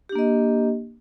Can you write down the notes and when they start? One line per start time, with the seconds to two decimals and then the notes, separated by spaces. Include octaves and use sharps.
0.09 G4
0.12 D4
0.15 A#3
0.19 D#5